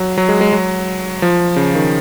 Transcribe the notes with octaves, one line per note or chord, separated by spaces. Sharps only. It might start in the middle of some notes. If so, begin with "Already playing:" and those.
Already playing: F#3
F#3
G#3
G#3
F#3
F3
C#3
D#3